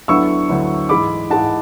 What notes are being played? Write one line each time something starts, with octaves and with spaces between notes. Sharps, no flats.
D2 D3 F#3 B3 E4 C#6 E6
D2 D3 F#3 B3 E4
G#2 E3 G#3 B5 D6
G#2 E3 G#3 F#5 A5